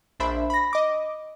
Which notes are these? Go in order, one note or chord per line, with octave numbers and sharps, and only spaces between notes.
A#1 D4 C5 E5 B5
B5 A#6
D#5 D6